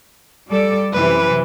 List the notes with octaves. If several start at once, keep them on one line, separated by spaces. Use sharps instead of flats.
G3 A4 D5
F#2 C3 E3 B4